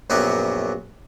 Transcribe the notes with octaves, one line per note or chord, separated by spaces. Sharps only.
A#1 F#2 F#3 B3 G4 C#5